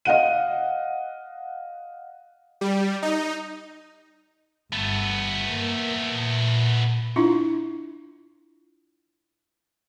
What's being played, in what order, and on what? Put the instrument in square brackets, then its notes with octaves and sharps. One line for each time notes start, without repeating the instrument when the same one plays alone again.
[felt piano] D#5 F5 F#5 D#7
[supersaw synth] G3
D#4
[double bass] G1 [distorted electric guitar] A3 B3
[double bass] A#3
A#2
[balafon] D4 E4 F4